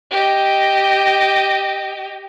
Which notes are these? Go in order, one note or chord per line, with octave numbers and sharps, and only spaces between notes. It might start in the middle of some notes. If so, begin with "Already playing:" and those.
G4 D#5